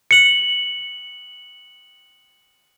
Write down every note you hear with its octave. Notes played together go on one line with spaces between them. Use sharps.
C#7 F#7